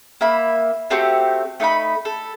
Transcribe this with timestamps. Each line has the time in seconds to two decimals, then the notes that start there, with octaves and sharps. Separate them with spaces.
0.21 A#3 E5 B5
0.90 A3 C4 F#4 G4
1.60 A3 D#4 F#5 B5
2.05 A4